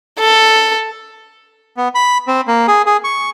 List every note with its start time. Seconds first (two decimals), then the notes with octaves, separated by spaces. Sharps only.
0.20 A4
1.77 B3
1.95 B5
2.27 C4
2.47 A#3
2.68 G#4
2.86 G#4
3.04 C#6